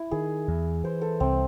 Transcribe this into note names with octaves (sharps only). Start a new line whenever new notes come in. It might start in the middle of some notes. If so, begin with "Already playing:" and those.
Already playing: E4
D#3 G#4
E2
E3 C5
A4
C2 C4